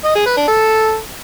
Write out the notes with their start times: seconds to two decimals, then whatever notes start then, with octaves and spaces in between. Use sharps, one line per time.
0.04 D#5
0.15 G#4
0.26 B4
0.37 D4
0.48 A4